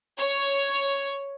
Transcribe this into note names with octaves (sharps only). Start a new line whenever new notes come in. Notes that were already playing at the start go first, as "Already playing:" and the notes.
C#5